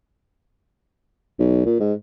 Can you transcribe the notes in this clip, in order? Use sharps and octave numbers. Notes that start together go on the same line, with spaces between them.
B1
A#2
G#2